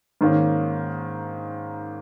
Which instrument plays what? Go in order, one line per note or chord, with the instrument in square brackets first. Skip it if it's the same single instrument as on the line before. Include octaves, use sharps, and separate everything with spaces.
[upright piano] G#2 D#3 A#3 C#4